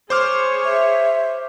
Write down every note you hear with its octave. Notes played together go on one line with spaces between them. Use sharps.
G#4 C5 C#5 D6 F6
E5